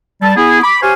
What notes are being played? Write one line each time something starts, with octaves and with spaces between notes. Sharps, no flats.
G3 A5
B3 E4 G#4
B5 D6
G4 C5 C#5 F5 G#5